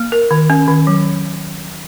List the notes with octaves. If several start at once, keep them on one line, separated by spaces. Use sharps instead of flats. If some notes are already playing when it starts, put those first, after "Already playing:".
Already playing: A#3
A#4
D#3
C#4
D#3
F#3